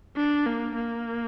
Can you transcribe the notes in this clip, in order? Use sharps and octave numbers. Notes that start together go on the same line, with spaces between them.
D4
A#3
A#3